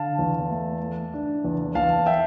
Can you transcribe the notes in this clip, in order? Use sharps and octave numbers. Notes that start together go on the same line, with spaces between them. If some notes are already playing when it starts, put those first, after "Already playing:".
Already playing: D3 F5 A5
E2
A3
A3
D4
E2
E2 F5 A5
E5 G5